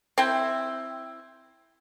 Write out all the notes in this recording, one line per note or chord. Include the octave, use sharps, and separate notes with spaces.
C4 E4 G5